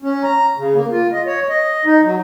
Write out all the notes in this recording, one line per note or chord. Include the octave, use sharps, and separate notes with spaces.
C#4
A#5
C#3
A#3
F4
D#5
C#5
D#5
D#4
F#3